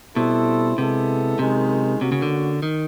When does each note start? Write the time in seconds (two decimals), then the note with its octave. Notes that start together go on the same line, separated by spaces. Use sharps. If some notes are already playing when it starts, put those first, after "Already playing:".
0.16 B2 G3 C4 E4 A4
0.78 C3 G#3 B3 E4 A4
1.39 F#2 C3 D#3 G#3
2.01 C3 A#3 C#4 F#4
2.12 C#3
2.22 D3
2.63 D#3